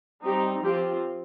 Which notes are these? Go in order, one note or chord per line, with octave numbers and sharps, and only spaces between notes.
G3 C4 D#4 G4
F3 C4 F4 G4